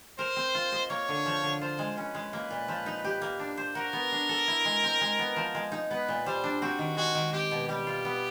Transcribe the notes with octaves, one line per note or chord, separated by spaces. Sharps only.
A#4 C5
C4
F4
D#5
A#3 C#5
D3
F3
D3
F4 C5
G#3
C#4 B4
G#3
A#3
A#2
F3
D#4
G4
A#3
D4
C5
F#4 A#4
B3
D4
A4
E4
G#3
C4
G#3
B3
F3
G#3
D#4
B3 B4
A#2
G3 C5
D4
C4 F#4
D#3
G#3 F#4
D#3
C4 G4
B2
G3 G4
F4
B3